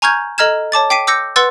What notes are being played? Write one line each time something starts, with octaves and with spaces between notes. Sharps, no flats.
G#5 A#5 C#6 F6 G6 G#6
A4 D#5 A#5 F6 G#6 E7
C#5 A5 D6 A6
G5 D6 B6 C7 D7 D#7
D6 E6 G6 A#6 C#7
B4 F#5 C6 E6 A6